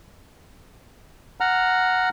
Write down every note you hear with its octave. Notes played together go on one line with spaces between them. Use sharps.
F#5 A#5 F6